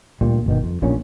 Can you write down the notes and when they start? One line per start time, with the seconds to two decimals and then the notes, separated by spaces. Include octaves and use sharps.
0.21 D2 A#2 G3
0.46 G1 B2 D#3
0.63 F2
0.82 D1 A#1 A#2 C#4